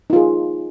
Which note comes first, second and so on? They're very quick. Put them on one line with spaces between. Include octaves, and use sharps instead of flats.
D#4 F4 G#4